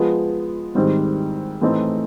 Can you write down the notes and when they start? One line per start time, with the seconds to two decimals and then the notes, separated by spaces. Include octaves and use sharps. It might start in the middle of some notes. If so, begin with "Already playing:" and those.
Already playing: F3 G#3 B3
0.75 G#2 D#3 G3 C4
1.62 A2 E3 A3 C4 D#4